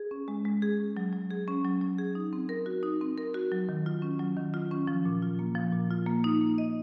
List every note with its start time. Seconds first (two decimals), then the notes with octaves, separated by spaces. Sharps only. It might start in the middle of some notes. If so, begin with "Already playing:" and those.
Already playing: G#4
0.11 C#4
0.28 G#3
0.45 G#3
0.62 G#4
0.80 C#4
0.97 F#3
1.13 F#3
1.31 G#4
1.48 C#4
1.65 F#3
1.81 F#3
1.98 G#4
2.15 D#4
2.33 C4
2.49 A#4
2.66 F#4
2.83 D#4
3.01 C4
3.18 A#4
3.34 F#4
3.52 F#3
3.69 D#3
3.86 F4
4.02 C#4
4.19 F#3
4.37 D#3
4.54 F4
4.71 C#4
4.87 F3
5.05 A#2
5.22 F4
5.39 A#3
5.55 F3
5.73 A#2
5.91 F4
6.06 A#3
6.24 D#4
6.41 A#3
6.58 D#5